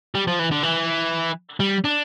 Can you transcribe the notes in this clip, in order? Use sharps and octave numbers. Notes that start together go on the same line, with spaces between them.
G3
F3
E3
D3
E3
G3
D4